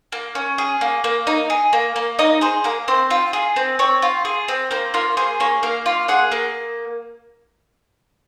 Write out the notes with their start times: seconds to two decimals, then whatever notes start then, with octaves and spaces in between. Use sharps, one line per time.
0.12 A#3
0.35 C#4
0.58 G#4
0.81 A#3
1.04 A#3
1.27 D#4
1.50 G#4
1.73 A#3
1.96 A#3
2.19 D#4 D#5
2.41 G#4 C5
2.64 A#3 A#4
2.88 C4 C5
3.11 F4
3.33 G#4
3.56 C4
3.79 C4 C#5
4.02 F4
4.25 G#4
4.48 C4
4.71 A#3 C5
4.94 F4 A#4
5.17 G#4 C5
5.40 A#3 C#5
5.63 A#3 F5
5.86 F4
6.08 G#4 F#5
6.32 A#3